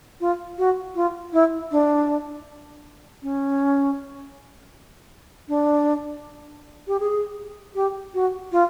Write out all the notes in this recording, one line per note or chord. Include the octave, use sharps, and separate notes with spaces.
F4
F#4
F4
E4
D4
C#4
D4
G4
G#4
G4
F#4
F4